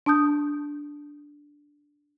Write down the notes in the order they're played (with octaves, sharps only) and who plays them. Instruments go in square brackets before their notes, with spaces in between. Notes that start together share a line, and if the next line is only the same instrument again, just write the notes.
[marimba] D4 A5 D#6 G6